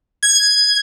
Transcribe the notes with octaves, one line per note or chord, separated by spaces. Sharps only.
G#6